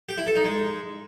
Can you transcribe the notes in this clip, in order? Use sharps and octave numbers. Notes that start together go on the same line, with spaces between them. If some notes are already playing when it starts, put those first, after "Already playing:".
G4
E4
A4
D#4
G#3